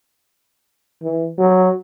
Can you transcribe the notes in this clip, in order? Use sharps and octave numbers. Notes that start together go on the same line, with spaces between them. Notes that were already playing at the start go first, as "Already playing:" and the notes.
E3
F#3